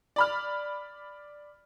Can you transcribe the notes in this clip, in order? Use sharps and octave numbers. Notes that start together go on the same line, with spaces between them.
D5 B5 F6